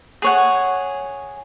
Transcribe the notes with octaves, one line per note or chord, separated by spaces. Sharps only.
G#4 C#5 F#5